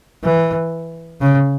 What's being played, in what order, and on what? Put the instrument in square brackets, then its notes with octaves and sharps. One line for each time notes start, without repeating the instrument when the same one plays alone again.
[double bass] E3
C#3